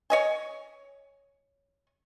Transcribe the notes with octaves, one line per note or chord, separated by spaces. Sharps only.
C#5 D#5 G#5